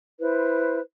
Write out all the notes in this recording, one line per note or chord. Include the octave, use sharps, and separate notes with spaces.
E4 B4 C5